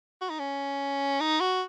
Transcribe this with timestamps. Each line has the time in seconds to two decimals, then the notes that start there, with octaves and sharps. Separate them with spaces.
0.22 F#4
0.30 D#4
0.39 C#4
1.21 D#4
1.40 F#4